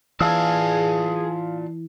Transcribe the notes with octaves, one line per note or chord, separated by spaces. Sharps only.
E3 F4 G#4 D5 F5 A5 E6